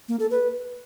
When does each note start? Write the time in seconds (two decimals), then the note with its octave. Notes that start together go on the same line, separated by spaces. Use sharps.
0.08 A#3
0.20 A4
0.31 B4